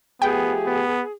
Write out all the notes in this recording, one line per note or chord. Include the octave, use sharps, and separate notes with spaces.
F3 A3 B3 G4 G#4 G5
B3